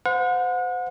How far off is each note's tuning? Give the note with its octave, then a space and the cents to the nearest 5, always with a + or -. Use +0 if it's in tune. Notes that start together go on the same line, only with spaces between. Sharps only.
C5 -35 F#5 -35